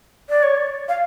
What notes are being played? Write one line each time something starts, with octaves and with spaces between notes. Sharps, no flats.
D5
C#5
D5
F5